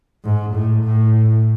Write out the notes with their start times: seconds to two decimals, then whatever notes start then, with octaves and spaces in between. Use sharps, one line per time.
0.25 G#2
0.54 A2
0.84 A2